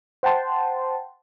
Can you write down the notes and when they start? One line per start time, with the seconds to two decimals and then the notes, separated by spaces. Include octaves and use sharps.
0.23 C5 F#5 G5 A5 C6